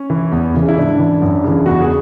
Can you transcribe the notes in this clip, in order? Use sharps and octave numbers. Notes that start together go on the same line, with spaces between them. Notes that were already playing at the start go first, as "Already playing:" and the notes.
Already playing: C#4
E3
E2
C#3 E3
E4
G#2 D4
E3
F#2
C#3 E3
E2 F#4
G#4